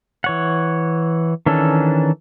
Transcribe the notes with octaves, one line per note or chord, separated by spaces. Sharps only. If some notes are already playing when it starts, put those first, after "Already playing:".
E3 C#5 F#5
D#3 E3 C#4 D4 A4